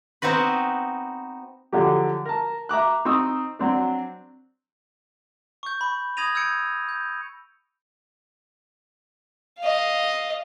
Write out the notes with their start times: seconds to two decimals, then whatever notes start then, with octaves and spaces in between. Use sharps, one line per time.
0.22 B3 C4 D#4 F#4 B4
1.73 D3 F3 F#3 G4
2.25 A#4 A5
2.69 E5 A#5 D6 F#6
3.05 C4 D#4 C#6 D#6 E6
3.59 F#3 C4 D4
5.63 C#6 G6
5.81 B5 C#6
6.17 B5 D#6 G#6 A#6 D#7 F7
6.35 E6 G6 G#6 C#7 D7
6.89 G6
9.59 D#5 F5